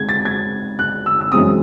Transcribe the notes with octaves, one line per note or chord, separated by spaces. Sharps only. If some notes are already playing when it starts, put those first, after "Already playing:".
Already playing: G#3 C4 G#6
A6
G#6
F#6
E6
E6
F#2 E3 G#3 C4 D#6